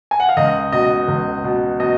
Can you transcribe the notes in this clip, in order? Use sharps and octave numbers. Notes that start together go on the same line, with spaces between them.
G#5
F#5
F5
C#2 D#5
B2 D#5
C#2
B2
B2 D#5